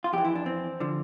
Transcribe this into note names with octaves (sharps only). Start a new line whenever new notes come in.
F4
F2 G4
E3
E4
D4
C4
D3 F3